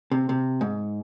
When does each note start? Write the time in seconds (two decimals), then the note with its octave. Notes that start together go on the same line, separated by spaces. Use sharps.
0.11 C3
0.29 C3
0.61 G#2